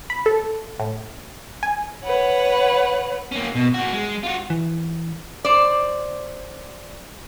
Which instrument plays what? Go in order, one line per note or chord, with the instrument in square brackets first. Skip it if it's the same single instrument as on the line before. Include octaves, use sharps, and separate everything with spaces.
[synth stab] B5
A4
A2
G#5
[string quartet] B4 C#5 F#5
[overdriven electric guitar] A#3 C#4
B2
A#3 F#4
G#3
F4 F#4
[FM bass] E3
[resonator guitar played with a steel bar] C5 D5